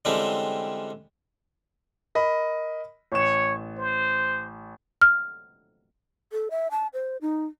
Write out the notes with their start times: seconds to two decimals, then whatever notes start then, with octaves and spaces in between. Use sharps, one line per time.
0.05 D3 E3 G3 G#3 C4 C#4
2.15 A#4 D#5 B5
3.12 A1 C#5 E7
3.78 C5
5.02 F6
6.32 A4
6.51 E5
6.71 A5
6.94 C5
7.21 D#4